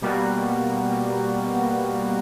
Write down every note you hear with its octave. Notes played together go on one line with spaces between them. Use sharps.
B2 G3 A#3 B3 F#4